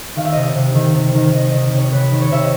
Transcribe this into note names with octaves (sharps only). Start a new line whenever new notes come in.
D#3 F5
E5
C3 D#5
E5
C3
D#3
C3
D#3
D#3 D#5
D#3 D#5
C3 C#5
C3 B4
D#3
C#5
C3 E5
D#5